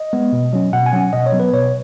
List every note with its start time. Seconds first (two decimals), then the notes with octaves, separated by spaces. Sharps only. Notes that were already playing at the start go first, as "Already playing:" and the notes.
Already playing: D#5
0.13 G#3 B3
0.33 B2
0.53 F#3 C#4
0.73 B2 F#5
0.86 G#5
0.93 F#3 C#4 F#5
1.13 B2 D#5
1.26 C#5
1.33 F#3 B3
1.40 B4
1.53 B2 C#5